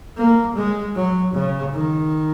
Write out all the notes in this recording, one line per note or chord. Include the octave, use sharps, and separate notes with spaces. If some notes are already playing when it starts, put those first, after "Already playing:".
A#3
G#3
F#3
C#3
D#3